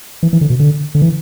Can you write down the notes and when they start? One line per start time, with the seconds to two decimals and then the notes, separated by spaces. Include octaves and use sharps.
0.23 E3
0.33 E3
0.41 D3
0.50 B2
0.60 D3
0.95 D3
1.02 E3